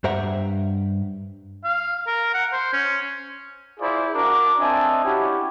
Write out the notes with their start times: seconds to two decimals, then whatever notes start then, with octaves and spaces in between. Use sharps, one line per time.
0.04 G2 G4 C5 E5 F#5 A#5
1.65 F5
2.07 A#4
2.34 F#5
2.53 C5
2.73 C#4
3.80 E4 F4 G#4 C5 D5 E5
4.14 D4 F#4 A#4 D6
4.60 C4 D4 D#5 E5 G#5 A5
5.05 C#4 E4 F#4 G4